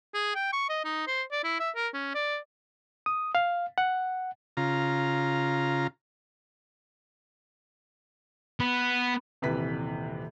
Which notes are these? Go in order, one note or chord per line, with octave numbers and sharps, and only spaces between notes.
G#4
G5
C#6
D#5
D#4
C5
D5
E4
E5
A#4
C#4
D5
D#6
F5
F#5
C#3 F4 A#5
B3
D#1 C3 E3 B4 B6